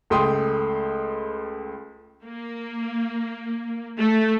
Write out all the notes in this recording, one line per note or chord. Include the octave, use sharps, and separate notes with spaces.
C#2 A3 G5 C6 D#6
A#3
A3